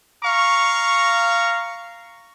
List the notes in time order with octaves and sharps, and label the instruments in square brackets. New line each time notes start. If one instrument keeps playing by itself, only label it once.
[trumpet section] F5 A#5 C#6